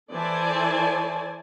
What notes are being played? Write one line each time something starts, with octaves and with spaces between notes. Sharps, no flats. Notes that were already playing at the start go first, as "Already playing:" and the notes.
E3 A4 C5 D5 G#5 A5